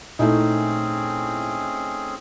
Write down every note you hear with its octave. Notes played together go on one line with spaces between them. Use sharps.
G#1 A#2 A3 C4 C#4 D#4 E4 G#4